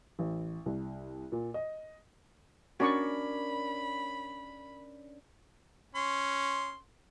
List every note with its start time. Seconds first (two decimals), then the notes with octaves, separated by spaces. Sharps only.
0.19 A1
0.66 C2
1.32 A#2
1.54 D#5
2.80 C#4 D4 F#4 A#4 D5 B5 C#6
5.95 C#4 C6